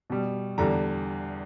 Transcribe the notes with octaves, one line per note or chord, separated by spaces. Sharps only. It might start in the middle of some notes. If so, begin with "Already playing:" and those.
B2 G3
E2 D3 G3 A#5